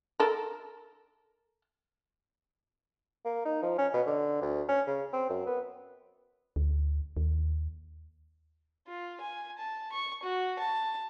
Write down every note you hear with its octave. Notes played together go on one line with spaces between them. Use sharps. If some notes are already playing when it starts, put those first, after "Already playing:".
A4 A#4
A#3
D#4
F3
C#4
B2
D3
D2
C#4
C#3
C4
F#2
B3
D2
D#2
F4
G#5
A5
C#6
F#4
A5